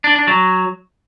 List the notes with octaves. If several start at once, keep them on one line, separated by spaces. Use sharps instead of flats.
D4
D4
F#3